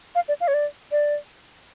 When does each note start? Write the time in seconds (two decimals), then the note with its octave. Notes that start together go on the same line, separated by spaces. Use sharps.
0.15 F5
0.28 D5
0.41 F5
0.48 C#5
0.54 D5
0.92 D5